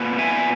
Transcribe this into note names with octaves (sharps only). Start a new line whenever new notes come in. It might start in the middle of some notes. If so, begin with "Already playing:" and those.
Already playing: A#2 B3
E5 G#5